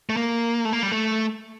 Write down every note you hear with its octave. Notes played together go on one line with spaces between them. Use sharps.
A3
A#3
A3
A#3
G3
A3